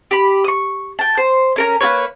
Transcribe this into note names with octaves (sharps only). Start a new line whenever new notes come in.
G4 B5
C#6 D#6
G5 A5
C5
C#4 A#4 A#5
A#3 F4 B4 C#5